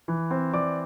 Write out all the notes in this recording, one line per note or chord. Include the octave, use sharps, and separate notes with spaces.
E3
C4
E3 D5 D6